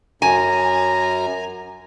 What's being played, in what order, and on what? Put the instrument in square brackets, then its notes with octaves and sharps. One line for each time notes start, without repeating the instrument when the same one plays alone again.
[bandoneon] F#2 A#5 [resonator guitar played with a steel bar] G#5